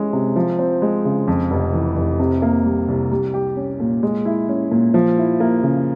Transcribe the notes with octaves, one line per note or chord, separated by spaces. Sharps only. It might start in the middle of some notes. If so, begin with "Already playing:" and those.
Already playing: E3 G#3 C#4
C3
F3
C4
G#3
C#3
F2
F1
E3
F1
C3
A#3
G3
C2
G3
G4
C#4
A#2
G#3
E4
C#4
A#2
F3
E4
A#3
C#3